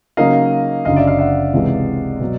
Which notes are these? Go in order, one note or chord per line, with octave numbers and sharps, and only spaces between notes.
C#3 F#3 A#3 D#4 D#5 F5
F#1 F#2 D3 D#5 F5
D5 E5
D#5 F5
E5 F#5
C#2 C3 E3 G#3
B2 F#3